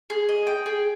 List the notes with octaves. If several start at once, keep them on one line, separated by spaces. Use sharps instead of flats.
G#4
D#5
G5
G#4